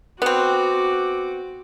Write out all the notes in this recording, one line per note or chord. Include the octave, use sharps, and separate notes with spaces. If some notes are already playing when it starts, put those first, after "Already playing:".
B3 C4 F#4 D6